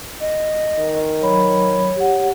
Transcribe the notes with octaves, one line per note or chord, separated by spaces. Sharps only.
D#5
D#3
F#3 C#5 B5
G4 F#5